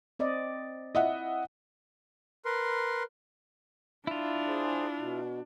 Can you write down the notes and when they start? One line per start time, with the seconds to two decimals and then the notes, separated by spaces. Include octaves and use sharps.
0.19 C4 D5 D#5
0.95 E4 D#5 E5 F#5
2.45 A#4 B4 C6
4.07 D4 E4 F4
4.47 G#4 C5
4.97 B2